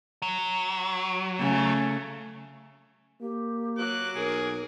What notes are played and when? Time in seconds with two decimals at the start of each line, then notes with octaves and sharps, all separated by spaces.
0.22 F#3
1.39 C#3 A3
3.21 A#3 G4
3.77 F#3 D6 F#6
4.16 B1 G#4 A#4